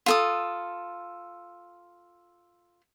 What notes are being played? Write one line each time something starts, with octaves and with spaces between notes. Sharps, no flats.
F4 A4 D#6